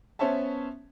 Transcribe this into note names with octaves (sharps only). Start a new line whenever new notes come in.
B3 C#4 C5 C#5 E5 A5